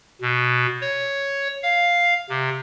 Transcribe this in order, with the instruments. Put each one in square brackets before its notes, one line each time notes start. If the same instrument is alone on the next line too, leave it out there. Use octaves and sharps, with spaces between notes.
[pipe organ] B2
C#5
F5
C3